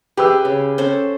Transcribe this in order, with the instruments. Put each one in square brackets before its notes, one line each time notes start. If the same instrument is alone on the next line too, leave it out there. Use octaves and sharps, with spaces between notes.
[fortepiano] G4 B4 E6 [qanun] G#4
[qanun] C#3
C#4 A4 C5